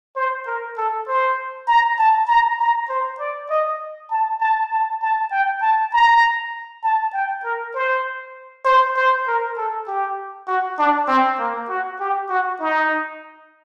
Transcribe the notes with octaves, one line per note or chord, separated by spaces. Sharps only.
C5
A#4
A4
C5
A#5
A5
A#5
A#5
C5
D5
D#5
A5
A5
A5
A5
G5
A5
A#5
A5
G5
A#4
C5
C5
C5
A#4
A4
G4
F#4
D4
C4
A#3
F#4
G4
F#4
D#4